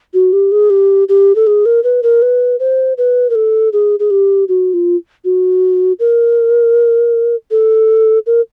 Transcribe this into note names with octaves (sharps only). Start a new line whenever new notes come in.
F#4
G4
G#4
G4
G4
A4
G#4
A#4
B4
A#4
B4
C5
B4
A#4
A4
G#4
G#4
G4
F#4
F4
F#4
A#4
A4
A#4